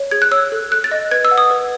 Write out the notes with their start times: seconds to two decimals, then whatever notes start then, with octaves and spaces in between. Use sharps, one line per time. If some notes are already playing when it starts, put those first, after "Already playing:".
Already playing: C#5
0.11 G#4 G#6
0.22 F#6
0.32 C#5 E6
0.52 A4
0.72 A4 F#6
0.84 A6
0.91 D#5
1.11 B4 G#6
1.25 E6
1.31 F#5
1.38 D#6
1.51 B4